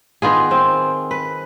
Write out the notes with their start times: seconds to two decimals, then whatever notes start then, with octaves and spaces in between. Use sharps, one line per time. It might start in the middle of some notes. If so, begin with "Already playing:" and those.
0.22 D#3 B3 F4 G#4
0.51 C4
1.11 B4